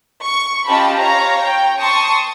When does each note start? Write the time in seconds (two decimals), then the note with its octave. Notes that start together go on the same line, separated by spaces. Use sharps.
0.23 C#6
0.68 C#4 F4 G4 D#5 A5 B5
0.99 C#5 F5 A#5
1.42 G5
1.81 A5 C6 C#6 D#6